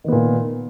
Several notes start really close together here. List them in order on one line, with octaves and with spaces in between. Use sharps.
D#3 B3 A#2